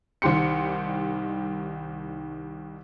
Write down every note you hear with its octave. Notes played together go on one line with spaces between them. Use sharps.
C2 D#3 G3 G4 C6 C#7